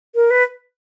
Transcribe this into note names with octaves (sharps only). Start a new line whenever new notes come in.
A#4
B4